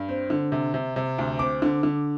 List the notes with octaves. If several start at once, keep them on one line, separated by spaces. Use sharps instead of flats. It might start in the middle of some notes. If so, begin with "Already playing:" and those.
Already playing: G2
C4
D3
C3
C3
C3
D2
C4 D6
D3
D3